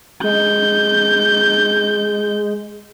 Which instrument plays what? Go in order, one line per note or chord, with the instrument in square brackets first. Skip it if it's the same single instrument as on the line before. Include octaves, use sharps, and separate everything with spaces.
[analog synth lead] G#3 [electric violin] G6